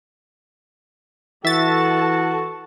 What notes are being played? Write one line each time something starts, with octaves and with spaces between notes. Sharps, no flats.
E3 F#4 A4 E5 A5 A6